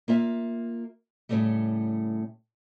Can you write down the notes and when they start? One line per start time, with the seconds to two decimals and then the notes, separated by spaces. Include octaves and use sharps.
0.08 A#3 F4 E5
1.29 A2 C#3 F#3 G3 A3